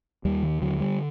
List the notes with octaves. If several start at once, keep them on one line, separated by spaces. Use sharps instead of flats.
D#2 G3
D#3
D3 F#3
G3